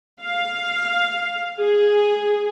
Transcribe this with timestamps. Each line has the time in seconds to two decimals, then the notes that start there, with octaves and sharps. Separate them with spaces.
0.21 F5
1.60 G#4